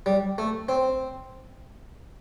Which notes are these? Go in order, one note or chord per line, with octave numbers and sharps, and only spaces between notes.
G3
A3
C4